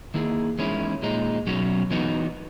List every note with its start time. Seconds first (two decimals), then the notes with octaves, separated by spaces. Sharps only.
0.14 D#3 A#3 E4 G#4
0.58 E2 D#3 G#3 C#4 E4
1.02 A#2 G#3 D#4
1.47 B2 F#3 C#4 F#4
1.91 E3 B3 D#4 F#4